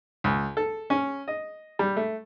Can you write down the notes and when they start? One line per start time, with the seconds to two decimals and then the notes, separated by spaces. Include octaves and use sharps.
0.24 C#2
0.57 A4
0.90 C#4
1.28 D#5
1.79 G3
1.96 A3